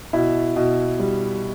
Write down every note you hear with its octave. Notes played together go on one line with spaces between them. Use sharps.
B2 E4
B2
G3